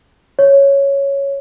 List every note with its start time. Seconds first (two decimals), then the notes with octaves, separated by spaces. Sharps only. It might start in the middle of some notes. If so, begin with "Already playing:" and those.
0.39 C#5